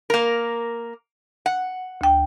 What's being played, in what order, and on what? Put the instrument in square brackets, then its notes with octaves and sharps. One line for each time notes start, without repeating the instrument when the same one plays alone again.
[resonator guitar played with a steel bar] A#3 A#4
F#5
[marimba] D2 G5